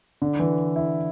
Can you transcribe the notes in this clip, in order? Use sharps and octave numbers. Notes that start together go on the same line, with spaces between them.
D3
E3
E4